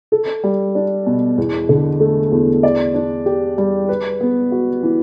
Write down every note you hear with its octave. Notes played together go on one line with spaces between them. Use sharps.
A4
G3
D4
B2
E2
D3
A3
E2
D5
D4
G4
G3
B4
B3
F#4
E3